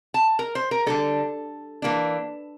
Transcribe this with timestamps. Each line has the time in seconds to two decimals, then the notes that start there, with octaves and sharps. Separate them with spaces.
0.14 A5
0.39 A#4
0.55 C5
0.71 A#4
0.86 D3 G3 D4 A4
1.82 E3 A#3 D4